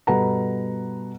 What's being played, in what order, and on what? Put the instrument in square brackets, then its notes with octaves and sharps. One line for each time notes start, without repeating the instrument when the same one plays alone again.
[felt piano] G2 B2 A4 B4 F#5 A#5